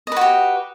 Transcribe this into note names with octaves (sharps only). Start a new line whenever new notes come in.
F#4 G4 B4 D#5